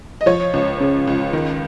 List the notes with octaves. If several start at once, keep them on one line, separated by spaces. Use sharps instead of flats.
D#5
F3 C#5
C#2
C#3
C#2
D#3